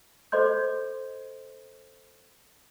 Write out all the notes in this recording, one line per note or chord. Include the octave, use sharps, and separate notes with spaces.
A4 C5 D#5 C6 G6